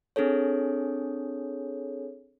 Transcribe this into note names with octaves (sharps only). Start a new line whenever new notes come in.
C4 D4 G#4 A4 C#5